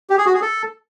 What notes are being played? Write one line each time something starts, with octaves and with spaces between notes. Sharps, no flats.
G4
G#4
F#4
G#4
A4